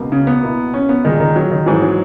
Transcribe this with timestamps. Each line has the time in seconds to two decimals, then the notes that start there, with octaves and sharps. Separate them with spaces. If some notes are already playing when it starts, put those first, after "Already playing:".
Already playing: C#2 B2 A#3
0.12 C#3
0.27 B3
0.43 B2 A#3 E4
0.74 C#4
0.89 B3
1.04 A#2 D#3 G#3 D#4
1.20 D#3
1.36 F#3
1.51 D#3
1.66 G#2 E3 F#3 G#3
1.82 F#3